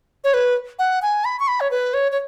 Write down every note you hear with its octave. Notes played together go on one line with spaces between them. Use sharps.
C#5
B4
F#5
G#5
B5
C#6
B5
C#5
B4
C#5
C#5